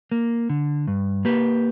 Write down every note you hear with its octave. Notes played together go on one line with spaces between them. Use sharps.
A#3
D3
G2
A#3 G4 B4